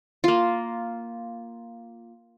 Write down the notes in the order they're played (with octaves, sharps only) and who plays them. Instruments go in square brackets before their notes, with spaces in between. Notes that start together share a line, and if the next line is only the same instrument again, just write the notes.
[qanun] A#3 F4